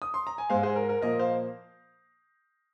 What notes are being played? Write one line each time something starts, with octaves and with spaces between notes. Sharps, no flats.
D#6
C6
A#5
G#5
G#2 G#3 C5 F5
G#4 C5
A#4
A#4
A#2 F3 A#3 A#4 D#5
C5 F5